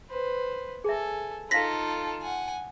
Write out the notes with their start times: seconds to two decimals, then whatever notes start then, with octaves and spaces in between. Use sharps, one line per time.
0.10 B4 C5
0.84 G#4 A4 E5 G#5
1.51 D#4 F4 A4 C5 F5 A#6 B6
2.21 F#5 G#5